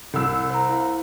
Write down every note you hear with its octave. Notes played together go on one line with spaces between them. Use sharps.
C2 E6
C5 A#5
E4 F5